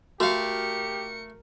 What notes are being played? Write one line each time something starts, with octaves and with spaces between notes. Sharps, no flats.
A3 F#4 G4 A#4 F5 C#7